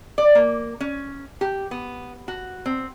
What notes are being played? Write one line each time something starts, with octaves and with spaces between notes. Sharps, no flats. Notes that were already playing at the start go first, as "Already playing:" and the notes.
D5
A#3
C#4
G4
B3
F#4
C4